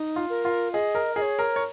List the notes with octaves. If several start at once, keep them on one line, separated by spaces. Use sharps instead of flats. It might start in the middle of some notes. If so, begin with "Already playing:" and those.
Already playing: D#4
F4
A#4
F4
G#4 D#5
A#4
G#4 D#5
C#5
A#4
C#5